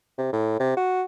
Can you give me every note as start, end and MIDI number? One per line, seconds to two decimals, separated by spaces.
0.18 0.30 48
0.33 0.57 45
0.60 0.73 48
0.77 1.03 66